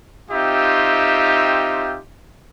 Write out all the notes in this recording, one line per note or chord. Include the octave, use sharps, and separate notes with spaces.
C4 D#4 F4 G4 E5